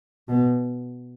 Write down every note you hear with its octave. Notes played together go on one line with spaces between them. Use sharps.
B2